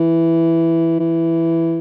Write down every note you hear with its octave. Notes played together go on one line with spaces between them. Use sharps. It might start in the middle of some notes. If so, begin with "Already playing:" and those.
Already playing: E3
E3